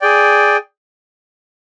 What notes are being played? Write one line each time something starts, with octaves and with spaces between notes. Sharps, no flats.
G#4 D5 G5